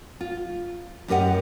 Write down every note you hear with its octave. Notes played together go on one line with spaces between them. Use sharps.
F4
F#2 G4 A#4 D#5 F#5